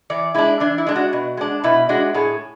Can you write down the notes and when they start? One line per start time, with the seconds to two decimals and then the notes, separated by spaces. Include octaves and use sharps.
0.10 E3 D5
0.34 G#3 D4 E4
0.60 E3 D4
0.78 E4
0.87 G#3 D4
0.96 F#4
1.13 B2
1.37 G#3 D4
1.64 B2 E4
1.89 G#3 D4 F#4
2.14 A2 G#4